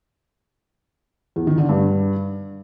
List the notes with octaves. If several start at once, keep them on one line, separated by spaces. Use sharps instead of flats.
E2
D#3
D3
G2